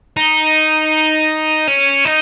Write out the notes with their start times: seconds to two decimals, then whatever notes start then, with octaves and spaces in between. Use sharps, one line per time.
0.17 D#4
1.67 C#4
2.05 D#4